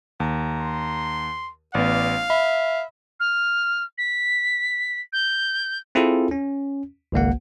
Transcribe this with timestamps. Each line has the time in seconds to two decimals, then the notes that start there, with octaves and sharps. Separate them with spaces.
0.20 D#2 A#5
0.60 C6
1.75 A1 B3 D5 F5
2.30 E5 B5
3.20 F6
3.98 B6
5.13 G6
5.95 C4 E4 F4 G#4 A4
6.31 C#4
7.12 G#1 C#2 A#3 F#5